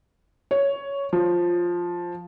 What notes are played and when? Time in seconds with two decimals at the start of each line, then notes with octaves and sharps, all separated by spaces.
0.51 C#5
1.13 F3